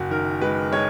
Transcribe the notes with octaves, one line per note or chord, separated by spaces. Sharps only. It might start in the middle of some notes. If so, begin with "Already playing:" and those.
Already playing: F#1 F#4
D#3 A#4
G#3 B4
G#3 C#5